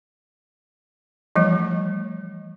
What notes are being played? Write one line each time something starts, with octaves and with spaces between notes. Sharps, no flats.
E3 F3 G3 A3